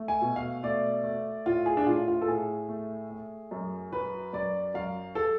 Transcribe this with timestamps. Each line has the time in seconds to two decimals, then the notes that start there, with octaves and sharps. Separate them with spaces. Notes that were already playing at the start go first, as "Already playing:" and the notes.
Already playing: A3
0.08 G#5
0.22 B2
0.36 F5
0.63 A3 D5
1.04 A3
1.46 A2 F4
1.66 G#4
1.77 D4
1.87 A2 F4
2.08 F4
2.21 A4
2.28 A2 G#4
2.69 A3
3.11 A3
3.51 F#2
3.92 F#3 B4
4.33 F#2 D5
4.74 F#2 F5
5.15 A4